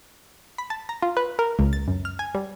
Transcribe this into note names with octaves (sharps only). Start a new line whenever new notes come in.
B5
A5
A#5
F4
B4
A#4
C#2
A6
F#2
F6
G#5
G3